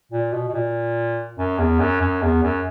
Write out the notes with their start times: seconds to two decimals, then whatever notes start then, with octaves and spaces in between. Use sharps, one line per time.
0.12 A#2
0.32 B2
0.49 B2
0.54 A#2
1.38 F#2
1.59 E2
1.79 F#2
2.01 F#2
2.22 E2
2.42 F#2